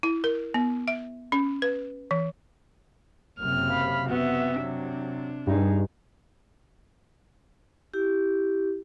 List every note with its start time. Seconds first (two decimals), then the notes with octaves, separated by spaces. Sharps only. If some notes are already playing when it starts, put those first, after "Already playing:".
0.03 E4
0.24 A#4
0.54 B3
0.88 E5
1.32 C#4
1.62 B4
2.11 E3
3.39 F#1 F#2 C3 F6
3.70 F5 B5
4.09 C3 B3 F#4 E5
4.61 F#3 D4
5.47 G2 D#4 G#4
7.94 E4 G4